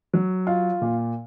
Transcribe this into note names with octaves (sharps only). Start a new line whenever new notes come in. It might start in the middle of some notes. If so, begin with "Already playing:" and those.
F#3
F4
A#2